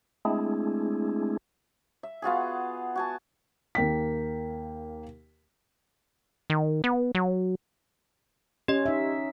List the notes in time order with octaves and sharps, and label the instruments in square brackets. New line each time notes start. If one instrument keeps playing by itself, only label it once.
[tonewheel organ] G#3 A3 C4 D4 E4 G#4
[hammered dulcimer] E5
B3 F4 F#4 G#4
F#4 G#5 A5
[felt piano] D#2 A#3 G5 B6
[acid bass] D#3
B3
F#3
[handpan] C#4 [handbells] G4 D#5
[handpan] D#4 E5